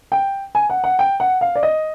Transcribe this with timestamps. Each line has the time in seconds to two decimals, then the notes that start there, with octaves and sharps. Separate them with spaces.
0.12 G5
0.55 G#5
0.70 F#5
0.84 F#5
0.99 G5
1.20 F#5
1.41 F5
1.55 D5
1.63 D#5